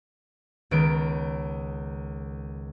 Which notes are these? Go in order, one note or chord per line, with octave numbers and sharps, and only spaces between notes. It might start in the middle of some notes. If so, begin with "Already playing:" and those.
C#2 D#3 B3 D7